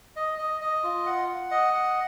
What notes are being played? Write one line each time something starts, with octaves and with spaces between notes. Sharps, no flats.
D#5
D#5
D#5
F4
F#5
F#5
D#5
F#5